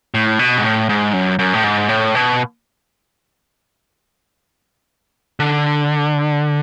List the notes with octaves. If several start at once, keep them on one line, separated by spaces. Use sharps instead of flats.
A2
B2
G#2
A2
G#2
F#2
F#2
A2
G#2
A2
B2
D3